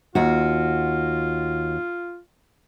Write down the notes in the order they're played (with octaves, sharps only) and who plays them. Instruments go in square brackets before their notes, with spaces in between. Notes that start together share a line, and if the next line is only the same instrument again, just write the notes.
[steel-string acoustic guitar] D#2 F#4 [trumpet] F4